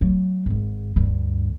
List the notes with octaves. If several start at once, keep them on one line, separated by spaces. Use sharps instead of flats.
F#3 A3
G#1 G#2
D2 G2